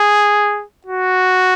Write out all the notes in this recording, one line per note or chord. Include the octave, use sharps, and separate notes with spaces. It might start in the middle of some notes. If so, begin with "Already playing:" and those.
Already playing: G#4
F#4